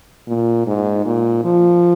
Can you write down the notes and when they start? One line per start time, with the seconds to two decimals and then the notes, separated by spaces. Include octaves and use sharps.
0.27 A#2
0.67 G#2
1.06 A#2
1.44 F3